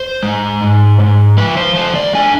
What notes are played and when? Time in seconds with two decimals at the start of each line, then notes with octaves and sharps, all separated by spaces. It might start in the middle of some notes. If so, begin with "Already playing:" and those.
Already playing: C5
0.23 G#3
0.61 G#2
1.00 G#2
1.37 F3 B4
1.57 C5
1.75 A3 C5
1.95 D5
2.15 D4 G#5